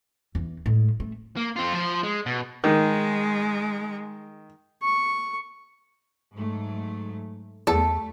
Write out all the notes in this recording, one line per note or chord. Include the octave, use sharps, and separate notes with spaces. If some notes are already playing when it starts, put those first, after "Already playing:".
E2
A2 G#3
A3
A#3
C4 F4
F3 C5
G#3
B2
D#3 G#3
C#6
G#2 F#3 A3
E2 G3 A3 A4